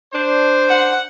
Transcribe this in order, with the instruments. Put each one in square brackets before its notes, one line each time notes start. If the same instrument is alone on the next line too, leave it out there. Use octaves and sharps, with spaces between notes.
[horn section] D4 C5
[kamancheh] F#5